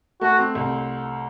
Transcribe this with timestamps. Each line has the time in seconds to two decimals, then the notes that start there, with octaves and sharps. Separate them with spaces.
0.21 A3 F#4
0.39 C4
0.55 C2